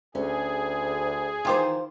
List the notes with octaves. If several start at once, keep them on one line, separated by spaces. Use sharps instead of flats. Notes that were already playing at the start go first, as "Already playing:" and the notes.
D2 C#4 G#4
D#3 E3 F4 G4 C5